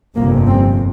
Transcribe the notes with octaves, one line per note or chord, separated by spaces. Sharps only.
G1 F2 C3 A#3
C4